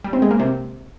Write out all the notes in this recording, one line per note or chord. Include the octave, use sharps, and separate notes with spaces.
G3
C4
G#3
A#3
C3